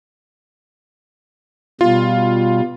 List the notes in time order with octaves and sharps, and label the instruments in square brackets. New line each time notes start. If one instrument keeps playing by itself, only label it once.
[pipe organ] B2 G3 [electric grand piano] F4